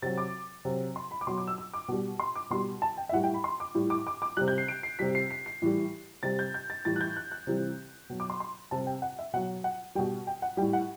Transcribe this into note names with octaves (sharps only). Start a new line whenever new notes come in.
C3 F#3 A6
D6
C3 F#3
C6
B5
D6
B2 F#3 C6
D6
E6
E6
D6
B2 G3
C6
D6
B2 G3 C6
A5
G5
E5
A2 G3 F#5
G5
B5
C6
D6
A2 G3
D6
D6
D6
C3 G3 F#6
G6
C7
D7
C7
C3 G3 B6
C7
C7
C7
A2 E3 G3
C3 G3 A6
G6
G6
A6
A2 E3 G3 A6
F#6
G6
F#6
F#6
C3 E3 G3
B2 F#3
D6
C6
C6
C3 G3 A5
G5
F#5
E5
B2 F#3 F#5
F#5
B2 G3 G5
G5
F#5
A2 G3 G5
F#5